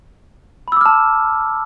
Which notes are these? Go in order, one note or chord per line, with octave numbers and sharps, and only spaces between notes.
A5 B5 D6 E6 F6